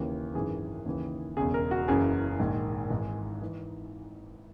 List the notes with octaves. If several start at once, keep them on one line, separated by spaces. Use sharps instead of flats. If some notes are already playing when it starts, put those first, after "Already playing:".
Already playing: D#2 C#3 E3
G#1 F#2 E3 G#4
D#2 C#3 E3
E1 E2 C#3 G#4
A#4
F#4
F#1 F#2 C#3 E3 G#4
A#1 G#2 D#3
G#1 G#2 E3
E3